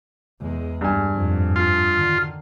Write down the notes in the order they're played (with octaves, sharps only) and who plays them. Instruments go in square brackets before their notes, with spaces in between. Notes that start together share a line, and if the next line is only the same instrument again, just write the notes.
[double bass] E2 G#3
[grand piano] G2 G#5
[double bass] F2 G#2
[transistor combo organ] F4
[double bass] D3 D#3